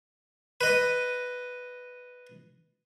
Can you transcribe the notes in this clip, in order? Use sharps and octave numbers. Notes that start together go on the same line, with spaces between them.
B4 D#5